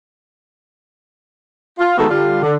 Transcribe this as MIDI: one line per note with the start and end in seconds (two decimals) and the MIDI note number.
1.79 1.95 65
1.98 2.06 51
1.98 2.06 56
1.98 2.06 57
1.98 2.06 59
1.98 2.06 66
1.98 2.06 69
2.10 2.39 50
2.10 2.39 55
2.10 2.39 65
2.43 2.55 50